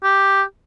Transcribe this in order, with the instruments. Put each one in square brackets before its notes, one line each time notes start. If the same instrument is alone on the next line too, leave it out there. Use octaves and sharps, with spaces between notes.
[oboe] G4